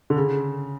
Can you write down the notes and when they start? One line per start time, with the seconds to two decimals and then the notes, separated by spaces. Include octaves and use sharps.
0.10 D3
0.16 C#3